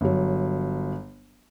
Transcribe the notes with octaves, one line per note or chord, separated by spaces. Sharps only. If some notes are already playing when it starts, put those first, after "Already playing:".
G1 F#3